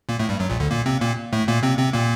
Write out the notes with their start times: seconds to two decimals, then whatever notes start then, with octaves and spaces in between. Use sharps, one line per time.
0.09 A#2 A#3
0.19 A2 A3
0.29 G2 G3
0.39 F#2 F#3
0.49 A#1 A#2
0.60 D2 D3
0.71 A#2 A#3
0.86 C3 C4
1.01 A#2 A#3
1.33 A2 A3
1.48 A#2 A#3
1.63 C3 C4
1.78 C3 C4
1.93 A#2 A#3